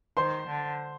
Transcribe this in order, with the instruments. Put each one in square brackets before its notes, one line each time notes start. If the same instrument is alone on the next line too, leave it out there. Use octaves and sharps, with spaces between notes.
[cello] D#3 [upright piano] C5 C6
[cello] D3